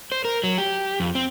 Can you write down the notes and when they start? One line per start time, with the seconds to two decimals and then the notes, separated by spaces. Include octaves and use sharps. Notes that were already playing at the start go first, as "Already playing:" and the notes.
0.12 C5
0.25 A#4
0.43 F#3
0.58 G4
1.00 F2
1.15 C4